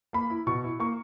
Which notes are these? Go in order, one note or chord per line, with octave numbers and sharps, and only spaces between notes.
A#3 B5
E4
B2 C#6
E4
A#3 C#6